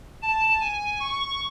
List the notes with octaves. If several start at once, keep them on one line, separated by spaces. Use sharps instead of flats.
A5
G#5
C#6